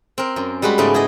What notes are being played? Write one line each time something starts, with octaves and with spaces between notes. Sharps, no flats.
C4 A#4
F#2
G3 G#3 F#4 B5
G#2 C#3 A3 B3 D5
E4 G#4 A4 D#5